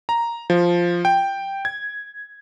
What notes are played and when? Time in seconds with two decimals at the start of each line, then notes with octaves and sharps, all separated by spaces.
0.09 A#5
0.50 F3
1.05 G5
1.65 G#6